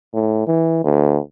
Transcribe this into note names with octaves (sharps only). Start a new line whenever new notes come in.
A2
E3
D2